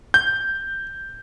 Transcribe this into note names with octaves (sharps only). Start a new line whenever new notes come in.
G6